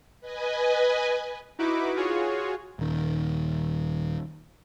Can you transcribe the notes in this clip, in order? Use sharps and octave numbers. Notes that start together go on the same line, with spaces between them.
B4 D#5 G#5
D#4 E4 F#4 B4 D6
F4 F#4 G#4 C#5
D#1 D#3